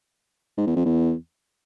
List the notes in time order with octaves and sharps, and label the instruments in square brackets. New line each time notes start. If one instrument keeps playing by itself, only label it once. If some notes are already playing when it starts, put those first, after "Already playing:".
[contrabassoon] G#2
E2
F2
E2